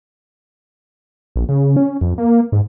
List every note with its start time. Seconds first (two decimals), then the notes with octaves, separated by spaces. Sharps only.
1.36 A#1
1.49 C#3
1.76 C#4
2.01 F2
2.18 A#3
2.52 G#2